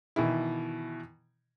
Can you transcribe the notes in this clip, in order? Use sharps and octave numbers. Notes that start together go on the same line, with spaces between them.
B2 D#3 E3 E4